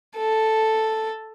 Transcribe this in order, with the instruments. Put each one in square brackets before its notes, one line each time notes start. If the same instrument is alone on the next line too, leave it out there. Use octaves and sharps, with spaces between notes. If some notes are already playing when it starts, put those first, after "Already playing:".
[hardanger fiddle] A4